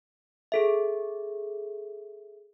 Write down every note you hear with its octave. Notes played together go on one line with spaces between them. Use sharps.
G#4 A4 E5